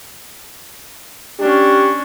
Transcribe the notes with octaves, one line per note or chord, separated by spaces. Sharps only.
C#4 D4 G4